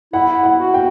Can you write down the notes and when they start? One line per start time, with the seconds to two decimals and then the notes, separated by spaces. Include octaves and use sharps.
0.13 E4 F#5
0.43 F#5
0.59 F#4
0.74 G5